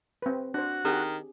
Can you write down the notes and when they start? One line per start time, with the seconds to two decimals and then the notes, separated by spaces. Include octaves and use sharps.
0.22 C4 B4
0.54 D4 F#4 C5
0.85 D#3 C4 G4 G#4